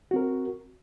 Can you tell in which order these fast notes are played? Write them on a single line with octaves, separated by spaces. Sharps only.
F#4 C4 A#4